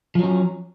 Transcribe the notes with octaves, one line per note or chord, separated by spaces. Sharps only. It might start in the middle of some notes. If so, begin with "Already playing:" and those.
F3 F#3 C#4